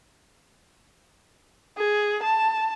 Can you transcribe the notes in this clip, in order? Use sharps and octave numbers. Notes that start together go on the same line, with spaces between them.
G#4
A5